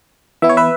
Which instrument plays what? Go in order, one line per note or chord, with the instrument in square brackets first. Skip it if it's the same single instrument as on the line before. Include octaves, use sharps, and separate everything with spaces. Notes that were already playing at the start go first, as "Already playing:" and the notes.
[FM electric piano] E3 B3 E4 E5
C#5
B4 E5